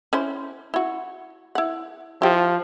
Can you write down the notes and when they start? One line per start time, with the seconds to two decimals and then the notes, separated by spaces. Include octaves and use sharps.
0.13 C#4 E4 C5
0.74 E4 F#4
1.55 E4 F#5
2.22 F3 E4 G4